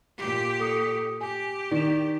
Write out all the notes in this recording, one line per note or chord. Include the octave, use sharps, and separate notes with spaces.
A#2 G4
A4 D#6 C#7
G4 G#5
D#3 D5 E7